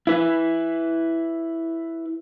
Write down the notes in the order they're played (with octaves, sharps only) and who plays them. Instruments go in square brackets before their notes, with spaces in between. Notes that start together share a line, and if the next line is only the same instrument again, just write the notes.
[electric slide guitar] E4 B4